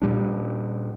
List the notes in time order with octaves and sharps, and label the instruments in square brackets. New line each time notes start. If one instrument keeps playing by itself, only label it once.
[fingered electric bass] A#2 G3 D4